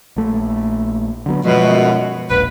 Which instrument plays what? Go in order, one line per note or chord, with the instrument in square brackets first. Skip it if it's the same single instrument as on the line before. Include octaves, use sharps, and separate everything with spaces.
[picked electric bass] A#1 A3
D3 F#3 B3
[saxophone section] F#2 B2 [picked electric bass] F3 G#3
[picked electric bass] E1 A#1 [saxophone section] B4